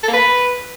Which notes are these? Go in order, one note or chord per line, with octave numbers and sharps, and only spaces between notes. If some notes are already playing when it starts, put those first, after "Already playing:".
A4
A#3
B4